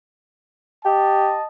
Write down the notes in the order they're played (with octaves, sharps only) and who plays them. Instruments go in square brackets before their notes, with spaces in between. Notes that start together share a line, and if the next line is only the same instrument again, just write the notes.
[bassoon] G4 [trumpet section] D#5 A5